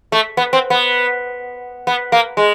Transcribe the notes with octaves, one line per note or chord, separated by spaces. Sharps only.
A3
B3
C4
B3
B3
A#3
G#3